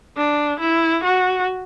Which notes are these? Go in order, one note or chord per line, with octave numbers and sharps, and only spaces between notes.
D4
E4
F#4